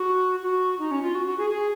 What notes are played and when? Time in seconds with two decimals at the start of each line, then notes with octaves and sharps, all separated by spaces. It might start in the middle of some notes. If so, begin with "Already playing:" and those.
Already playing: F#4
0.43 F#4
0.79 D#4
0.91 C#4
1.03 F4
1.15 F#4
1.27 F#4
1.38 G#4
1.50 G#4